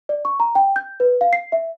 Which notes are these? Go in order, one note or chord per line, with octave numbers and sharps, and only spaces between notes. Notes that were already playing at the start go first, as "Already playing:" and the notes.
D5
C#6
A#5
G5
G6
B4
F5
C7
E5